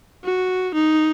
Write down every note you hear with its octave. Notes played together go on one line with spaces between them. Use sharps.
F#4
D#4